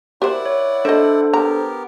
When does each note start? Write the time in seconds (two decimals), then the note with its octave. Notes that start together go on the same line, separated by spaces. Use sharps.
0.22 E4 G4 A#4 C5 D5 F#5
0.46 C#5
0.85 D4 A4 C5 D#5 E5
1.34 B3 G4 A#4 A#5